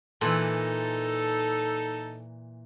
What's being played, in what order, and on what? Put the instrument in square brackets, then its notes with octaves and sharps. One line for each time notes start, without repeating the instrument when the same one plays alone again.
[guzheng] A#2 E3 [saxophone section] D#4 A4